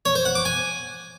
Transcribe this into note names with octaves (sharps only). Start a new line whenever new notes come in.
C#5
C5
F#5
D6
G#5